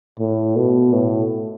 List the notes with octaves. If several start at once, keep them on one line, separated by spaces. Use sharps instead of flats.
A2
B2
A2